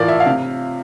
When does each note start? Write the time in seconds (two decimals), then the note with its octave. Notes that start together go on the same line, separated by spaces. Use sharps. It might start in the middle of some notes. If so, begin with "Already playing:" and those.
Already playing: A2 E3 F4 A#4 D5
0.08 E5
0.20 F5
0.26 C3